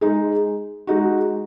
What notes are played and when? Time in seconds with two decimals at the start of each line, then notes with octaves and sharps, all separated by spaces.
0.01 G#3 D#4 G#4
0.87 G#3 D#4 F#4